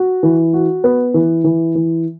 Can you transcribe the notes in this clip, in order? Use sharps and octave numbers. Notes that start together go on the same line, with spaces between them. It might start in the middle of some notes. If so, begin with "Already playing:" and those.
Already playing: F#4
E3
F#4
B3
E3
E3
E3